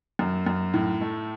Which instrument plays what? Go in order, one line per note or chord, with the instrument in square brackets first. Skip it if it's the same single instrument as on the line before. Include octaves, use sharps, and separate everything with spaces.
[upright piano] F#2
F#2
A2
A3